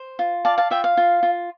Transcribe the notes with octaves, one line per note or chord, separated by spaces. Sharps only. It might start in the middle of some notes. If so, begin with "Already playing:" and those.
Already playing: C5
F4
D5 F5 A5
F5 A5
F4 E5 G5
F5
F4
F4